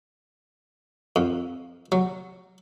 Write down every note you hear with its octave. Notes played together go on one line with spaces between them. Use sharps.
F2
F#3